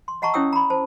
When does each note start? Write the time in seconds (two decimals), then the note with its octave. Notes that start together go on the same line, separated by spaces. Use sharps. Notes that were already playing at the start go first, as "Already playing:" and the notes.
0.08 C6
0.22 D#5 F#5 A5 A#5 C#6
0.34 C#4 E4 C#5 G5 D#6 E6
0.53 A#5 B5
0.70 C5 A5